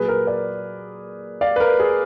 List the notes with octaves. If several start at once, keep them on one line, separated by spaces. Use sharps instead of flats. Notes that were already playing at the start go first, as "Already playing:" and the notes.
Already playing: A#2 F#3 G#4 B4
A#4
A#4 D5
D5 F5
B4
A#4
G#4